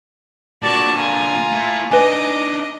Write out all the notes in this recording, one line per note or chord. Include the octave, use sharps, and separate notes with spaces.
A#2 D3 F#4 D5 A5 C#6
F4 G#5 A#5
A3 E4
D4 D#4 B4 D#5 G#5 D6